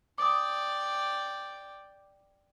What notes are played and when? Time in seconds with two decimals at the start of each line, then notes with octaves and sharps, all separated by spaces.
0.18 D5 G5 D6 D#6